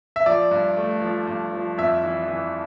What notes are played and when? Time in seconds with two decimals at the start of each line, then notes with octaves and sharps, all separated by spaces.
0.16 E5
0.26 F3 D5
0.51 G2
0.77 A3
1.02 F3
1.27 G2
1.53 F3
1.78 F2 E5
2.03 E3
2.28 E3